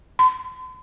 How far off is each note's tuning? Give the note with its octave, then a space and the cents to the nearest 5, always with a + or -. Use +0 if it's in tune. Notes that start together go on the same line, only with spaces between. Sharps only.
C6 -45